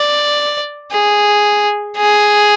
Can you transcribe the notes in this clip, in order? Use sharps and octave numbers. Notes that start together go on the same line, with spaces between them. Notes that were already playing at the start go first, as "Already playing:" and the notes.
Already playing: D5
G#4
G#4